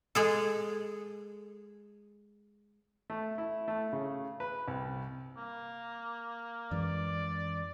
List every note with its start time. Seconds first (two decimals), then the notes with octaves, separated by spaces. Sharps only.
0.15 G#3 G#4 A4
3.10 A3
3.38 E4
3.68 A3
3.93 C#3
4.40 B4
4.68 C2
5.37 A#3
6.71 F#2 E3 G#3 D5